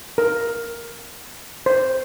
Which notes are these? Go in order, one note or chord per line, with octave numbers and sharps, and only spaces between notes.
A#4
C5